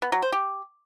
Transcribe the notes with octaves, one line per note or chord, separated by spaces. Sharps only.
B3
F#3
C5
G4